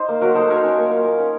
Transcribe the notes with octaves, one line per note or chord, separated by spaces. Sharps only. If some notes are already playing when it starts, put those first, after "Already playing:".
Already playing: D#4 C5
A#3
F#3 F#4 A#4
D#4 A4 C5
F#3 A#4 C#5
C#4
A#3
F4
A#3
C#4